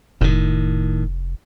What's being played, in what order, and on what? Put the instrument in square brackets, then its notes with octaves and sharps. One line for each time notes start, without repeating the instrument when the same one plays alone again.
[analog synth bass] F1 [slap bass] A2 D#3